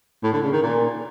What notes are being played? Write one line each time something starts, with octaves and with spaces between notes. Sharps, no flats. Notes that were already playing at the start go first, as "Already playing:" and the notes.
A2
D3
C#3
D#3
A#2